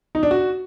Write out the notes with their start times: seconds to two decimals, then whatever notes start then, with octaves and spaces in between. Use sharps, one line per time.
0.15 D#4
0.23 D4
0.31 F#4